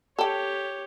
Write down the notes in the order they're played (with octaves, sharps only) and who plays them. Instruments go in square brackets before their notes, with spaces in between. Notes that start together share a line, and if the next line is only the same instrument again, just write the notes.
[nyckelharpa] G4 C#5 [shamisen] A4 G5